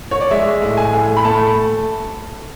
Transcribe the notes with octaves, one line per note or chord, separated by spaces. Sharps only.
C#5
D5
G#3 E5
A2
G#5
A2
B5
A3 A5